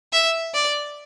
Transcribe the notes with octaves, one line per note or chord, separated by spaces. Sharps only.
E5
D5